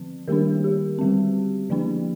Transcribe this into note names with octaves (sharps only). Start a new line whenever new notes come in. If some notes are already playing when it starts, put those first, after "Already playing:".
Already playing: D3 F3 C4
D#3 G3 A#3 D4 G4 A#4
G4
D3 G3 C4
D3 F3 A#3 D4